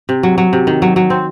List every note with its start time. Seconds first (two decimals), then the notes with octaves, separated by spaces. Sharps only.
0.09 C3
0.23 F#3
0.38 F#3
0.53 C3
0.67 D#3
0.82 F#3
0.96 F#3
1.10 C4